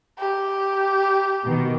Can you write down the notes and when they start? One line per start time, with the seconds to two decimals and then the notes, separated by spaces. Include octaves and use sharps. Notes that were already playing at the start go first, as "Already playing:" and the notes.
0.19 G4
1.44 B2 D#3